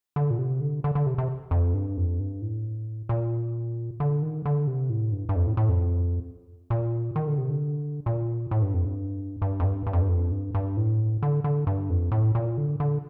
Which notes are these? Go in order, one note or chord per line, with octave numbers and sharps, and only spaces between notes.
D3
A#2
C3
D3
D3
D3
C3
C3
F2
G2
F2
G2
A2
A#2
D3
D#3
D3
C3
A2
G2
G2
F2
A2
A2
F2
A#2
D#3
D3
C3
D3
A#2
A2
G2
F2
G2
G2
F2
G2
G2
F2
G2
F2
G2
G2
A2
D3
D3
G2
F2
A2
A#2
D3
D3